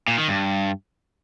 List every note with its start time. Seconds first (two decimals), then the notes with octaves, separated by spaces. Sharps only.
0.08 A#2
0.18 D#3
0.28 G2